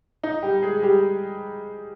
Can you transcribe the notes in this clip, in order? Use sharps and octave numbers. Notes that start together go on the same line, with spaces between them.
D#4
G3 G4
G#3 G#4
G3 G4